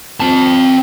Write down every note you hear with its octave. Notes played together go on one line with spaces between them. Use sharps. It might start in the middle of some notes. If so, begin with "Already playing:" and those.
C4 A5